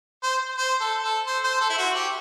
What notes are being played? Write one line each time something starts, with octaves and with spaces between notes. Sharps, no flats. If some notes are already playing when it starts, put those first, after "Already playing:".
C5
C5
A4
A4
C5
C5
A4
E4
F#4
G4